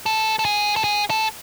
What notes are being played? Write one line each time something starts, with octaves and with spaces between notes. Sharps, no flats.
A4
A4
G#4
A4
G#4
A4